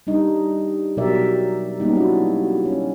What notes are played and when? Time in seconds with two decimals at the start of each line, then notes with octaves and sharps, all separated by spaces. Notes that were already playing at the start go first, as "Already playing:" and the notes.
0.07 G3 D4 D#4 D#5
0.97 B2 F#3 G4 A#4 D5 E5
1.80 G3 A#3 B3 C#4 D#4
1.95 F#3 D4 E4 F#4 D5
2.65 C#4